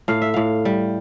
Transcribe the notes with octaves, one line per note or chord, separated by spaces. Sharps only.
A2 F5
E5
A2 F5
G3